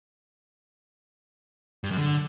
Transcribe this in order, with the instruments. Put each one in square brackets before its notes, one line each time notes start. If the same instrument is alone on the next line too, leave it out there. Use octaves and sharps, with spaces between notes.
[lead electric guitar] G2
F#2
D3